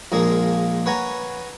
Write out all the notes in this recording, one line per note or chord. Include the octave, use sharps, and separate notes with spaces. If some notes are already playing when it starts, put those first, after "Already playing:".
A#1 A#2 G#3 A#3 G#4
B4 C#5 F#5 G#5 A#5 C#6